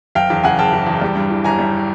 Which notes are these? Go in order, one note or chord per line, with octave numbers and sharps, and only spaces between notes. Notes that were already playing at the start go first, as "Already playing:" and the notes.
F#1 F5 G5
E2
C#3 F#5 G#5
F#1 G5 A5
F#1
E2
G3
G2
E3
G1 G#5 A#5
G3